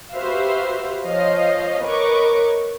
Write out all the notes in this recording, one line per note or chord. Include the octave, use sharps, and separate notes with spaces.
F#4 G4 B4 C5 E5 F5
F3 C#5 D#5 F5
A#4 B4 C#5 D#5 C#6 D6